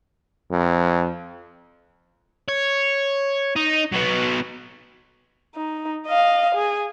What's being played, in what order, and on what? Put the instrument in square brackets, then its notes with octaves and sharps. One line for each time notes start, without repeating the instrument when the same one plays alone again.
[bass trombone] F2
[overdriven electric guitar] C#5
D#4
F#3 B3
[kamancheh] D#4
D#5 F5
G#4